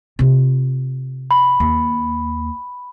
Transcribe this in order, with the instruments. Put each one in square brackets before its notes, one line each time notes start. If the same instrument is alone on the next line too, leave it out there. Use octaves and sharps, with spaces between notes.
[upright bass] C3 F4
[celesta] B5
[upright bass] D#2